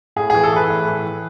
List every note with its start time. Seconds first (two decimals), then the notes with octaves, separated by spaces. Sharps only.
0.16 A2 G#4
0.30 E3 G#4
0.44 A4
0.53 E3 B4
0.70 A2
0.88 E3
1.05 E3